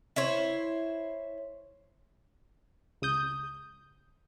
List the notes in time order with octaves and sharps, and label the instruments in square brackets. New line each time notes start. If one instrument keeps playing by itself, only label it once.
[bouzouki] E4 C5 C#5
[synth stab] C#2 D#6 G6